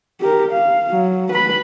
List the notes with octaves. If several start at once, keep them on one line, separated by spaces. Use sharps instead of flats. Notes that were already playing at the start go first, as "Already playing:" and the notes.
G4 A#4
F5
F#3
B4 B5